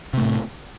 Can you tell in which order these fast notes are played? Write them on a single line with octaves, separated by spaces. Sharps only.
C3 A3 A2